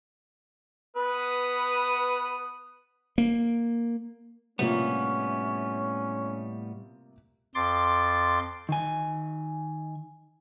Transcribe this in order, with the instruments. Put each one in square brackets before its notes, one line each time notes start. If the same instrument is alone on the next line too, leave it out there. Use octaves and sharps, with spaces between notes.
[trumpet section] B3 D#6 [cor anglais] B4
[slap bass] A#3
[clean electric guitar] A2 G3 B3 [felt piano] C3 F3 A#3 [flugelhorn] C#4
[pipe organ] F2 C6 D6 A6
[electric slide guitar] D#3 G#5